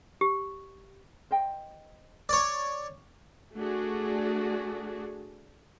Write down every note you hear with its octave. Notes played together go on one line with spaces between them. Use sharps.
G4
C5 D#5 G5
C#5 D5
A3 D4 F#4 G#4